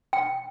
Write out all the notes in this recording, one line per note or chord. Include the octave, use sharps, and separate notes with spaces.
G5